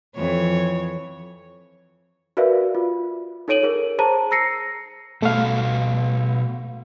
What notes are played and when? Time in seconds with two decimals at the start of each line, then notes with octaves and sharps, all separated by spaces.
0.16 F2 E3 C#5
2.37 F#4 A#4 B4 D5 E5 F5
2.75 F4
3.48 D#4 A4 C#5 D7 D#7 F#7
3.63 G#4 A#4
3.99 G#4 C5 A5 A#5 D#7
4.31 A#5 E6 A#6 C7 C#7
5.22 B2 A3 A4 F5